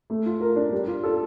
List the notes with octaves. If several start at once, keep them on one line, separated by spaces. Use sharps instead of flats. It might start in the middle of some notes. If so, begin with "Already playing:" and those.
A3
F4
A#4
D4
G3
F4
A4